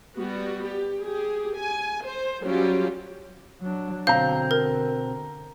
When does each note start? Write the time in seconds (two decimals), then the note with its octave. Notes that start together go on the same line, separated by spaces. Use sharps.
0.16 G3 B3 F#4
0.65 G4
1.04 G4 G#4
1.58 G#5
2.05 C5
2.42 F#3 G3 C#4 F4 G4
3.61 F#3 D4
4.07 B2 D3 C4 F5 A#5 G6
4.51 A#4